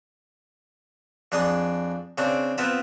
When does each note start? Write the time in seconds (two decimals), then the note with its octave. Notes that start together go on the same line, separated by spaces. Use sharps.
1.32 F2 D4 G#4 D5 D#6
2.18 C#3 C4 D4
2.58 B3 C4 F4 A5 B5